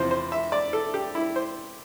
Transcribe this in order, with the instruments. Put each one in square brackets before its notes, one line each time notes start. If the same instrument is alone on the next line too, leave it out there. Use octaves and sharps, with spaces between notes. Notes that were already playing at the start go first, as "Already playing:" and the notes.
Already playing: [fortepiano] E2 C3 F3 C5
C5
E5
D5
A4
G4
E4
C5